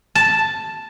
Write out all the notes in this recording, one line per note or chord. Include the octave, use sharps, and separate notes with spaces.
A5